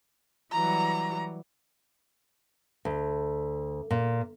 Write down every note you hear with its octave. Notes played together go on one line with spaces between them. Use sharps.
E3 F#3 G3 A#5
D2
A#2